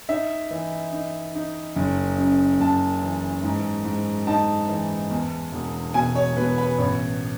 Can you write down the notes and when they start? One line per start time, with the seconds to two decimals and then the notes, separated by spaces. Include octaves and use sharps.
0.09 D#4 E5
0.51 E3
0.92 D#4
1.35 D#4
1.76 F#1
2.18 F#2
2.60 F#1 A5
3.02 E3
3.44 G#2
3.85 G#2
4.27 D#4 A5
4.69 E3
5.11 E2
5.52 E1
5.94 B2 G#5
6.15 C#5
6.36 B2 B4
6.58 B4
6.78 A1 C#5